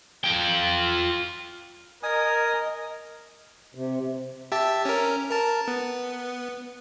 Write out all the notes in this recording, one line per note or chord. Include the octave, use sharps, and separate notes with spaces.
F4 G5
A#4 D#5 G#5 D#6
C3
G4 E5 A5
C#4 A#4
A#4 A5
B3